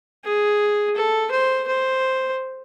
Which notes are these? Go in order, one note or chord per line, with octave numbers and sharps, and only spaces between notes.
G#4
A4
C5
C5